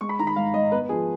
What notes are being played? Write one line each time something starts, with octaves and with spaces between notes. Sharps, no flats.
G#3 C#6
B5
D#3 A#5
B5
G#2 F5
G#2 D#5
B3 B4
F3 G#4